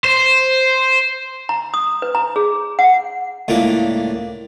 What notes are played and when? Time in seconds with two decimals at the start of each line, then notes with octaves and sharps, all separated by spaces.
0.04 C5
1.49 A#5
1.74 D#6
2.02 B4
2.15 A#5
2.36 G#4
2.79 F#5
3.48 C#2 A2 A#3 D4 D6